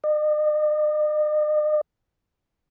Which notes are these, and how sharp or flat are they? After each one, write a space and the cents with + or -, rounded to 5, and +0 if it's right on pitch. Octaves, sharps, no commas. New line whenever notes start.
D#5 -45